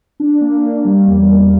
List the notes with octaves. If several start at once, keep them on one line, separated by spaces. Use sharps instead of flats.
D4
A#3
A#3
G3
E2
E2